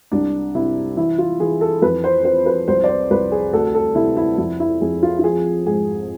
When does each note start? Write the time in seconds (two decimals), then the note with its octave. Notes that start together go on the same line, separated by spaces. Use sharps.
0.12 C2 D4
0.55 C3 E4
0.97 E3 E4
1.19 F4
1.40 E3 G#4
1.61 A4
1.82 F2 B4
2.04 C5
2.25 F3 C5
2.46 B4
2.68 C2 C5
2.84 D5
2.89 C5
3.11 C2 B4
3.32 G#4
3.53 D2 A4
3.75 A4
3.95 C3 E4
4.17 E4
4.38 F2 E4
4.60 E4
4.81 F2 G#4
5.03 F4
5.19 F4
5.23 F3 G#4
5.66 G#2 G#4